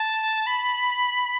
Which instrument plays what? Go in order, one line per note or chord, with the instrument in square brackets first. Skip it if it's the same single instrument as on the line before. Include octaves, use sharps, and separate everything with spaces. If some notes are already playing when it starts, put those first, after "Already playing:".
Already playing: [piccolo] A5
B5